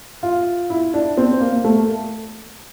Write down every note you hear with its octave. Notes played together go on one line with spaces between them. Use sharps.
F4
E4
D4
C4
A#3
A3